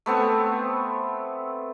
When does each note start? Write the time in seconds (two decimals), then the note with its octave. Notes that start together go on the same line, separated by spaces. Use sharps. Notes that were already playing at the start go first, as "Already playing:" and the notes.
0.06 A3 B3 C4 C#6